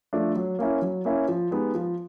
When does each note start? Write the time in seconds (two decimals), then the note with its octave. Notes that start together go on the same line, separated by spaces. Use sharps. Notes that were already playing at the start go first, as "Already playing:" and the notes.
0.13 F3 A3 D4
0.36 F#3
0.59 A#3 C#4 E4
0.82 F#3
1.05 A#3 C#4 E4
1.28 F3
1.51 G#3 B3 D#4 G4
1.75 F3